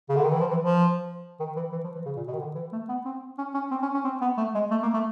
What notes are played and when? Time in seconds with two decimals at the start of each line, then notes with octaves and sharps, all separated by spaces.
0.09 C#3
0.16 D3
0.24 D#3
0.32 E3
0.40 F3
0.50 E3
0.62 F3
1.40 D#3
1.56 E3
1.72 E3
1.84 F3
1.95 E3
2.05 C#3
2.16 A#2
2.27 B2
2.33 D#3
2.39 D3
2.55 E3
2.72 A3
2.89 B3
3.05 C4
3.38 C#4
3.54 C#4
3.71 C4
3.82 C#4
3.94 C#4
4.04 C4
4.21 B3
4.37 A3
4.55 G#3
4.71 A3
4.83 A#3
4.94 A3